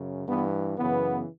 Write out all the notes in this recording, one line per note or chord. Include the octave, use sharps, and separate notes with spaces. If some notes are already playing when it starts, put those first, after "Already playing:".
Already playing: F#2 C#3
G2 E3 B3
F#2 C#3 E3 B3